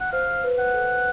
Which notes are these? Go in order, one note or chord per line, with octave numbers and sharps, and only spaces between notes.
F#5
C5 F5
B4
F#5
A4